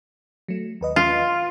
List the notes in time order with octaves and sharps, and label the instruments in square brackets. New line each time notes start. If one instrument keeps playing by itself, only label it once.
[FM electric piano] F#3 A3
D#2 B4 D#5
[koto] F4